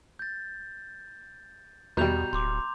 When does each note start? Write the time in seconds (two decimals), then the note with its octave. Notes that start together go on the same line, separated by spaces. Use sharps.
0.19 G6 A6
1.97 E2 B2 G3 A#5 G6 F7
2.33 D1 C6 D6